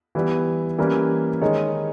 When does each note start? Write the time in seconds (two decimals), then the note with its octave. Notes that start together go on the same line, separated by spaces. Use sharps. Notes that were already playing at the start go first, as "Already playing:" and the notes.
0.15 E3 G3 B3
0.78 E3 G3 A#3 C#4
1.41 D#3 G#3 D#4 G#4 C#5